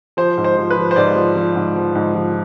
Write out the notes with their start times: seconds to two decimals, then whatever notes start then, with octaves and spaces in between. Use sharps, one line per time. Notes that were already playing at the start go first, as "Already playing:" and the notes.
0.17 F3 C5
0.37 G#2
0.44 C5
0.58 F3
0.70 B4
0.77 F3
0.91 C5
0.96 G#2 D5
1.16 F3
1.36 F3
1.56 G#2
1.76 F3
1.95 G#2
2.15 F3